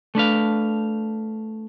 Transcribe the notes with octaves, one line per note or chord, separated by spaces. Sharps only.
A3 D4 B4 F5